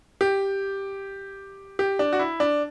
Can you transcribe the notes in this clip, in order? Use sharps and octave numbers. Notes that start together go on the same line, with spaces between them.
G4
G4
D4
F#4
E4
D4